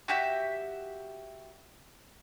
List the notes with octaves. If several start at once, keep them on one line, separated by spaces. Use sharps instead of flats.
F#4 G4 E5